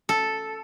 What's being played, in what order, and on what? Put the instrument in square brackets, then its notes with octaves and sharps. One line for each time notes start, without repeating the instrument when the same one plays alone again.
[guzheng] A4